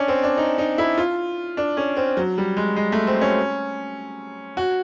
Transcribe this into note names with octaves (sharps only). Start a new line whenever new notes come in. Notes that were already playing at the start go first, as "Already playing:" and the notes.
Already playing: C#4 D4
C4
D4
D#4
D#4
E4
F4
D4
C#4
C4
F#3
G3
G#3
G#3
A3
C4
C#4
F#4